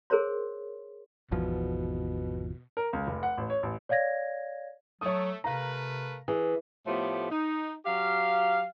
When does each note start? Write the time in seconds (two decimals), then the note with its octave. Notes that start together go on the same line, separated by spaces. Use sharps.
0.10 G#4 A#4 C5 C#5 C6
1.32 G#1 E2 B2 F3
2.77 A#4
2.93 C#2
3.07 F1
3.23 F#5
3.37 A1
3.50 C#5
3.63 A1
3.89 C#5 D5 F5 G#6 A#6
5.01 F#3 A3 C#5 D#6
5.44 C3 A3 A#4 B4 F5 A#5
6.28 E3 G#4
6.87 A2 F3 A3 B3 G4
7.30 D#4
7.86 F#3 G4 F5